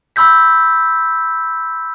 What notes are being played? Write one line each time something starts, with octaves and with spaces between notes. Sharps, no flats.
B5 C6 E6 G6 B6